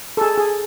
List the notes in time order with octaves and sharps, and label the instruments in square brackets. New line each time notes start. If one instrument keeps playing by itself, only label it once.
[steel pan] A4
G#4
G#4